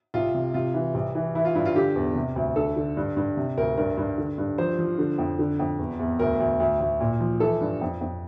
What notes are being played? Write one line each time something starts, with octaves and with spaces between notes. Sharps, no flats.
C2 F4
C3
C3 F4
E3
C2
E3
E3 E4
F4
G2 E4
F4
D3 G4
E2
C3
D2
D3 A4
D3
G2
G2
C3
D2 A#4
G2 A#4
G2
D3
G2
F3 C5
F3
D3
F2
D3
F2
E2
E2
D2 A#4
D2
D2
D2
A#2
F3
E3 A4
G2
F2
F2